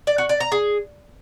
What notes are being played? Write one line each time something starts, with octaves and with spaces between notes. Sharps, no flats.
D5
F#4
D5
A#5
G#4